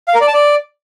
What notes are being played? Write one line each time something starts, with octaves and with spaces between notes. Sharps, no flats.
F5
A#4
D5
A5
D5